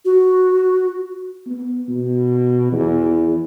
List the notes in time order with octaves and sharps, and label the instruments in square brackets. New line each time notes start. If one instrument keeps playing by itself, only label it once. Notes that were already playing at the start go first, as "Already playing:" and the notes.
[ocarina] F#4
[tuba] B3
B2
E2